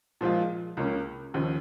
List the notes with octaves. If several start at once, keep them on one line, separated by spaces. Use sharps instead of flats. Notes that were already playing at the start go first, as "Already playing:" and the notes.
A#2 F3 G#3 F4
C#2 C#3 A#3 C#4
D#2 C#3 F3